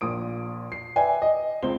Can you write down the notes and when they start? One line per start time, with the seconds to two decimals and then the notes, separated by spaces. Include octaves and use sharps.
0.01 A#1 A#2 D#6 D7
0.72 C7
0.96 B4 D5 E5 G5 G#5
1.22 D#5
1.63 C#2 C4 C5 G7